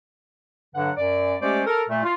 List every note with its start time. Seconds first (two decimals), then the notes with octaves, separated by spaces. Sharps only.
0.74 G2 D3 F#3 D4 F#5
0.96 F#2 D5
1.41 G#3 A3 C#4 G4 C5 D5
1.65 A4 A#4
1.89 A#2 A3
2.03 F4